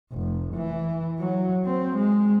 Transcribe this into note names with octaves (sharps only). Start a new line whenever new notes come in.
F1
E3
F#3
C4
G#3